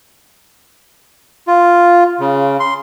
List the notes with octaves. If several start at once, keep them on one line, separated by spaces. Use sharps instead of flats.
F4
C#3
C6